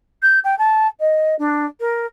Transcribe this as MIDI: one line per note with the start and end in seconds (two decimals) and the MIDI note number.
0.23 0.40 91
0.44 0.58 79
0.59 0.88 81
1.00 1.35 75
1.39 1.66 62
1.80 2.06 70